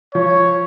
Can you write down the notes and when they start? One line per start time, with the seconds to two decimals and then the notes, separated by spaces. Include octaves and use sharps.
0.15 F3 C#5